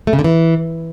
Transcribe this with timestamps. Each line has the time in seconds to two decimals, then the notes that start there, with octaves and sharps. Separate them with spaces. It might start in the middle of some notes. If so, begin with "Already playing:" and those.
0.07 A3
0.13 C#3
0.19 D3
0.24 E3